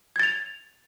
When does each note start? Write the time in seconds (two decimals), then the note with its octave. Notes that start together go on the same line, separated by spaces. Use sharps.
0.16 G#6
0.19 A6
0.23 F7